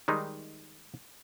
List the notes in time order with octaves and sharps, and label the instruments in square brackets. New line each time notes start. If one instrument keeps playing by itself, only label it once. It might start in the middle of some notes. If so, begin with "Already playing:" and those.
[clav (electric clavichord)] D#3 G3 G#3 D#4